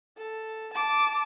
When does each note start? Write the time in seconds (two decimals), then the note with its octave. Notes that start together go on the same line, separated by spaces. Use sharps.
0.18 A4
0.74 A5 D6